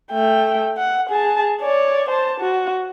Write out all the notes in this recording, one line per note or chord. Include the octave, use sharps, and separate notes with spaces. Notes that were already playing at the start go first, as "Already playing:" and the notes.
A3 G5
F#5
G#4 A5
C#5 D5
C5 A5
F#4